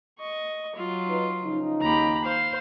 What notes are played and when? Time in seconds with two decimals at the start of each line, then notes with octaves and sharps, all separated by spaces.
0.19 D#5 C#6
0.76 F#3 F4
1.08 D#4 B4
1.44 C#3 F3 D#4
1.81 D#2 G4 A#5 B5
2.24 C5 F5